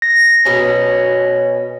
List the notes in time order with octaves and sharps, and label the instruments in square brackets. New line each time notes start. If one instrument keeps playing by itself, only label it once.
[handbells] A#6
[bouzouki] B2 C#4